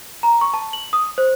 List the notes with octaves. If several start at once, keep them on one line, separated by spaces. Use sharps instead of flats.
A#5
C#6
A5
F#7
D#6
C5